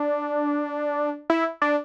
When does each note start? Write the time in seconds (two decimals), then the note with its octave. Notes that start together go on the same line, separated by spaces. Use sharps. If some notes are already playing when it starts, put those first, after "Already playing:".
Already playing: D4
1.30 E4
1.62 D4